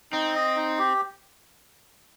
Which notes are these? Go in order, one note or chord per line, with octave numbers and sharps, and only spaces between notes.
C4 D#4
D#5
D#4
G4